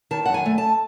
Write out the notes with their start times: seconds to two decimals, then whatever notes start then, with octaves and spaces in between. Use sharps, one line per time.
0.11 D#3 A5
0.25 F#2 F#5
0.34 G#5
0.46 A3
0.58 A5